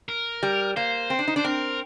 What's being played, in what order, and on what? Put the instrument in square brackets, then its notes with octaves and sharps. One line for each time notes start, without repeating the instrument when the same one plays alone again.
[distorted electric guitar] A#4
[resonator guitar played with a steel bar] G3
[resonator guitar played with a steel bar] A#3 [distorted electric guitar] C5
[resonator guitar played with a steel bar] C4
D4
D#4
[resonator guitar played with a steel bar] D4 [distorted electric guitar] C5
[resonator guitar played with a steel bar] C4 [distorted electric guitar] A#4